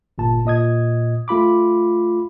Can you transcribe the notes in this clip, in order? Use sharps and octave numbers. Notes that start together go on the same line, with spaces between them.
G1 A#2 A5
A#2 D#5 D#6 G#6
A3 F4 B5 D6